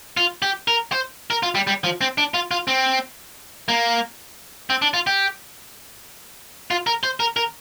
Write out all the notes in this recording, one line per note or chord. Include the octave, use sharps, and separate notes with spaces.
F4
G4
A#4
C5
A#4
F4
G3
G3
F3
C4
D4
F4
F4
C4
A#3
C4
D4
F4
G4
F4
A#4
C5
A#4
A#4